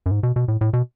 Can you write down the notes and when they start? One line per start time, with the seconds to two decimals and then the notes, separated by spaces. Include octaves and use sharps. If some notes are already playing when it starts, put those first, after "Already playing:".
0.06 F#2
0.11 G#2
0.23 B2
0.36 B2
0.48 A2
0.61 A2
0.73 B2